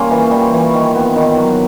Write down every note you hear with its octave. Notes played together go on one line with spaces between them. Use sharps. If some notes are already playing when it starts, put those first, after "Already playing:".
Already playing: C#3 G3 A#3 C#4 F4
E3
G3
E3
D#3
B3
D#3
F#3